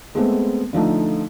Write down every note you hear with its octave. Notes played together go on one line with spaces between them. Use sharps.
G#3 A3 B3 C4
D3 F3 A3 D#4